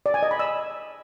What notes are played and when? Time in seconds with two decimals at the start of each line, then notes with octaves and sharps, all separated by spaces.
0.06 D5
0.14 G#5
0.23 D#5
0.31 B5
0.39 E6